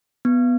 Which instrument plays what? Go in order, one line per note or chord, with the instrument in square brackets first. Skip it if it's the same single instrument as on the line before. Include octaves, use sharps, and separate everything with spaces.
[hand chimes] B3